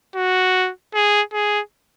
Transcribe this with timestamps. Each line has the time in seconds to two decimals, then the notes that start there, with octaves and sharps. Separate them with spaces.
0.16 F#4
0.94 G#4
1.33 G#4